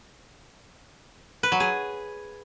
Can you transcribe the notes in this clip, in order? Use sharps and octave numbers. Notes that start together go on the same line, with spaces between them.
B4
F#3
G#4